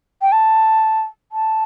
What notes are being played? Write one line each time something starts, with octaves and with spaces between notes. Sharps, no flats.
G5
A5
A5